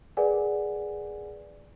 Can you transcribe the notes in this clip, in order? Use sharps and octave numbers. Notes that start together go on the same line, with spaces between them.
G#4 A#4 B4 D5 F#5 G#5